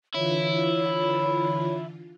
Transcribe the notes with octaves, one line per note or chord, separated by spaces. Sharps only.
D3 E3 E4 F4 C#5